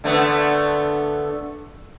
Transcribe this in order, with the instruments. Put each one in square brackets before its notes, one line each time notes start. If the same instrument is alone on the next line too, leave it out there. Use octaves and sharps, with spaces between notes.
[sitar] D3 A3 B3